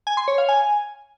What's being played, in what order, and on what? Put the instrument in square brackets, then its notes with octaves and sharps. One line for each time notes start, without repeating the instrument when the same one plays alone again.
[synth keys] G#5
C6
C#5
F5
G#5